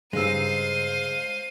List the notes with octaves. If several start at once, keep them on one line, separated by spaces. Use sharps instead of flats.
G2 C#3 G#3 D#4 C5 F5 E6 D#7